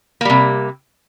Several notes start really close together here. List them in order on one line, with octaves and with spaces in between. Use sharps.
A#3 G3 C3